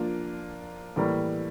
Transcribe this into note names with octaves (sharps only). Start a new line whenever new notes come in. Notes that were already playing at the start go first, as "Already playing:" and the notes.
Already playing: F3 A#3 D4 F4
A2 E3 G3 A#3